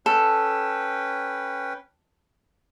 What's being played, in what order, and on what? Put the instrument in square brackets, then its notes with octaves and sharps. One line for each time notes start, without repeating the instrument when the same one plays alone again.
[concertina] C#4 B4 G5 [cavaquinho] A4